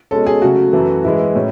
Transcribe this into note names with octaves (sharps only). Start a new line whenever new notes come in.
B2 G#3 C#4 A4
G#4
C#3 F#3 A3 F#4
F#2 E3 A3
G#2 E3 G#3 E4
A2 F#3 C#4